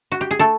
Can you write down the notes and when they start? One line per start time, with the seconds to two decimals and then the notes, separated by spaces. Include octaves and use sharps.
0.12 F#4
0.21 G4
0.31 G#4
0.39 A3 A4